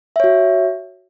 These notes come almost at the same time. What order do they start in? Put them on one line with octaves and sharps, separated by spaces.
E5 C#5 F#4